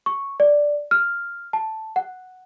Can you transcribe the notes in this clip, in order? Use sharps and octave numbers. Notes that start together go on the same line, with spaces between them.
C#6
D5
F6
A5
F#5